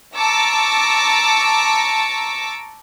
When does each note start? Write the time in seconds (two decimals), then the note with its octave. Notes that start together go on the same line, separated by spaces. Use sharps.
0.17 A5 A#5 C#6 D6 E6